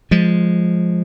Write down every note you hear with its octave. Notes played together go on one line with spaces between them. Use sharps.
F3 G#3